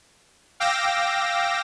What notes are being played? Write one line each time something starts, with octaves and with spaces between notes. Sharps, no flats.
F5 G5 D6 E6 A#6